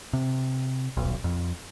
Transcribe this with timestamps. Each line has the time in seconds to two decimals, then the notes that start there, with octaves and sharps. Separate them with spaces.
0.13 C3
0.97 D#1 B1
1.24 F2